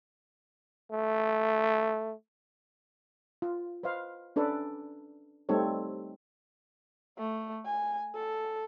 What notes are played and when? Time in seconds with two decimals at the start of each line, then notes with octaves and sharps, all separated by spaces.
0.92 A3
3.42 F4
3.83 B4 C5 D#5 F5
4.36 C#4 D4 A4 B4 D5
5.49 G3 A3 C4 D#4 A4 C#5
7.18 A3
7.65 G#5
8.15 A4